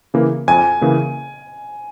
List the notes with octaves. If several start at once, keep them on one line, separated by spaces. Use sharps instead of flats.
C#3 E3 A#3
F2 G#5
C#3 E3 A#3